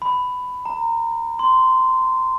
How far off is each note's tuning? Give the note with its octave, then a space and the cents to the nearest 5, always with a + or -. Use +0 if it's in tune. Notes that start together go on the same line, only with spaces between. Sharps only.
B5 +15
A#5 -20
C6 -15